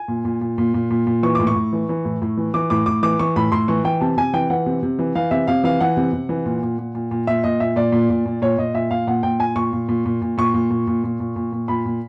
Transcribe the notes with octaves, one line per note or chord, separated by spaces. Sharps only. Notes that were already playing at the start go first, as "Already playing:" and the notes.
Already playing: G#5
A#2
A#2
A#2
A#2
A#2
A#2
A#2
E3 C#6
A2 D6
C#6
A2
E3
E3
A2
A2
E3
E3 D6
A2 D6
A2 D6
E3 D6
E3 C#6
A2 B5
A2 C6
E3 C#6
E3 G5
C3 A5
C3 G#5
E3 G5
E3 F#5
C3
C3
E3
E3 F5
C3 E5
C3 F5
E3 F5
E3 F#5
C3
C3
E3
A#2
A#2
A#2
A#2
A#2
A#2 E5
A#2 D#5
A#2 E5
A#2 D5
A#2
A#2
A#2
A#2 C#5
A#2 D#5
A#2 E5
A#2 F5
A#2 F#5
A#2 G5
A#2 G#5
A#2 C#6
A#2
A#2
A#2
A#2
A#2 C#6
A#2
A#2
A#2
A#2
A#2
A#2
A#2
A#2 B5
A#2